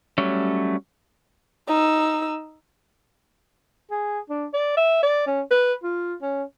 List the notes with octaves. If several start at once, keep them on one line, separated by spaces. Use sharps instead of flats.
F#3 G3 A3 C#4
D#4 E6
G#4
D4
D5
E5
D5
C#4
B4
F4
C#4